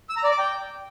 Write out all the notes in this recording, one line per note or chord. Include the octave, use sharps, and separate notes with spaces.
E6
A#5
D5
D6
G5